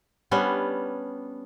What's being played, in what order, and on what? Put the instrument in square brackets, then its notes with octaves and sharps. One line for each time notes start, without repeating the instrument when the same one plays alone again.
[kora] G3 B3 C#4 D4